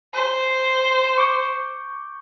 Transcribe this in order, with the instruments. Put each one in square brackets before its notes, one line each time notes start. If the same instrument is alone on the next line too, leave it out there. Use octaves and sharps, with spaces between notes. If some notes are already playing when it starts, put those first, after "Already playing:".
[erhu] C5
[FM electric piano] C#6 D6 G6